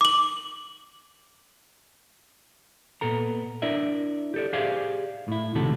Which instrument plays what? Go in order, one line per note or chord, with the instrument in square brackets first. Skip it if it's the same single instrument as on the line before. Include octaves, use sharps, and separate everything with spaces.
[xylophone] D6 F#7
[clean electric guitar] A#2 B3 A4 A#5
D4 E4 A#4 D5 E5
G4 A4 D5
G4 G#4 C5 D5 E5 F5
A2 E4
C#2 C3 D#3 A3 F#4 A4